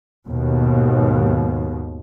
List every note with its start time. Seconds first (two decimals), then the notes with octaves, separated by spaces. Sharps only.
0.28 D#2 G#2 B2